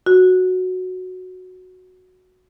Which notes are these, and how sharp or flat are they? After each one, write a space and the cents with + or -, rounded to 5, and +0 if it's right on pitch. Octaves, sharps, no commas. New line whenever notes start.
F#4 -5